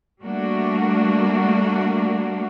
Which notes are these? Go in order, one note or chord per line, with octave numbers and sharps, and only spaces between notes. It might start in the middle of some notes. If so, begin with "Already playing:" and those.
G3 A3 A#3 D4 F#4